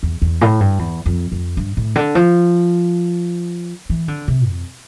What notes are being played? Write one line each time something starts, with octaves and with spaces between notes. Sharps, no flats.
E2
E2
A2
G2
E2
F2
F2
G2
A2
D3
F3
E3
D3
C3
F2